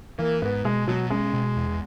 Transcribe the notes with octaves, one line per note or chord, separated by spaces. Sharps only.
E3 A#3
G#2 B3
B2 G#3
B2 F#3
G#3 C#4
B2
E2